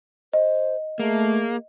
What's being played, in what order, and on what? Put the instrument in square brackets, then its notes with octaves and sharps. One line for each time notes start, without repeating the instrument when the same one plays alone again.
[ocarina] C5 [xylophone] D#5
[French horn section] A3 [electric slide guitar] A#3 [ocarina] G#4